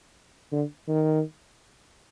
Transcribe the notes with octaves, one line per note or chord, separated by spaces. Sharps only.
D3
D#3